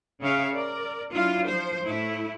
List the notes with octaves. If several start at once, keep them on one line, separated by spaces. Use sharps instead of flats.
C#3 G#4 C#5 E5 F5
A#4 D5
F#3 D4 E4 F4
F3 C5
A2 A3 E4